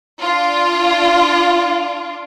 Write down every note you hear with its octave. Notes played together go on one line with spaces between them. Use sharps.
D4 F4